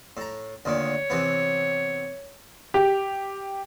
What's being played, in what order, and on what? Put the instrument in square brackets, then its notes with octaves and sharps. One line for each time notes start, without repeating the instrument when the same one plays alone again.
[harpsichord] A2 A#5
[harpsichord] D2 A#2 D#3 [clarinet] C#5
[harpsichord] C3 E3 B3
[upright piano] G4